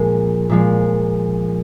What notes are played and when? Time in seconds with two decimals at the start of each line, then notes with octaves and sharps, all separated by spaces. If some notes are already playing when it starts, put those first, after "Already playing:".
Already playing: A#2 F3 G#3
0.49 A#2 F3 G#3